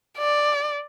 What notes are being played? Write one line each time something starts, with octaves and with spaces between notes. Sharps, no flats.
D5